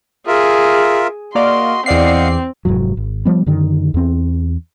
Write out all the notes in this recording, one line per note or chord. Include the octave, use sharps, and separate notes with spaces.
F4 G#4 A#4 E5
A#3 F#4 D5 D#5 F5 C6
E2 C4 D5 D#5 F5 F#5 C7
F1 B1 G#2 F#3
G#1
F3 G3 B3
F#2 D3 D#3
E2 C4